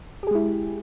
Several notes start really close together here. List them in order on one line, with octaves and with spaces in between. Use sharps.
G4 G#4 G#3 E4